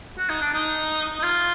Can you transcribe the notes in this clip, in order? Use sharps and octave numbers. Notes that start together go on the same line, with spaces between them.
F#4
D#4
D4
D#4
D#4
F4